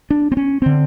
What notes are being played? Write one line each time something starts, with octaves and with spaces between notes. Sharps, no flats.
D4
C4
C#4
D3 C4